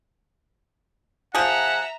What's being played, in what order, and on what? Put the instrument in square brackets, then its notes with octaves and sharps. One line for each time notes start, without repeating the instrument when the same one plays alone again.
[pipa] F3 G#4 [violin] E5 A#5 [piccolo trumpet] F#5